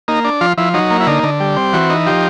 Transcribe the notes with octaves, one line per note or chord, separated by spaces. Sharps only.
A#3 D#4
D4
F3 F4
F3 E4
F#3 D#4
A#3
E4
D3 D#4
D3
G3
C4
E3 F#4
D#4
F3 G4